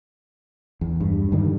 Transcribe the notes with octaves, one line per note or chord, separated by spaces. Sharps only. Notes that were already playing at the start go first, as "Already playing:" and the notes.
E2
G2
G2 D3 D#3 G3